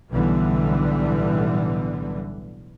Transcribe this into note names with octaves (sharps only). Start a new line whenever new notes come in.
B1 A2 D3 E3 G3 B3